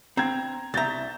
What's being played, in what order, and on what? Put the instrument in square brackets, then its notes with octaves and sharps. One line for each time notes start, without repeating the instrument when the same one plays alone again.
[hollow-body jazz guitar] C4 [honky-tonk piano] A#5 G#6
[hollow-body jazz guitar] C2 A#5 [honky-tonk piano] E5 G6 A6